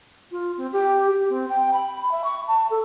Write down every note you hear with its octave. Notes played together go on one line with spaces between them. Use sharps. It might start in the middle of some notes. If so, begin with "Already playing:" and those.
F4
C4
G4
G4
C4
G5
B5
E5
C#6
A5
A4